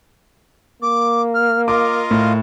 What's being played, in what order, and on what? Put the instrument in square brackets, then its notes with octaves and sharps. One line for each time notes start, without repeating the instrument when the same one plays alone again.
[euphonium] A#3 [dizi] D6
[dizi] F6
[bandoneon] F4 D#5 F5 [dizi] A#4 [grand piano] D6
[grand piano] A2